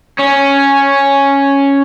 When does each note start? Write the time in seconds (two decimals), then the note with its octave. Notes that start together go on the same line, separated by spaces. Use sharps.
0.19 C#4